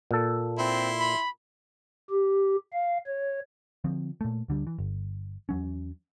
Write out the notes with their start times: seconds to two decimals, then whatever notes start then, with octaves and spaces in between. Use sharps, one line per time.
0.11 A#2 A4
0.59 C4 E4 C6
1.00 B5
2.10 G4
2.72 F5
3.07 C#5
3.84 D3 F3 C4
4.21 A#2 A3
4.48 D2 D3 G3
4.67 E3
4.79 G1
5.49 E2 F#3 C#4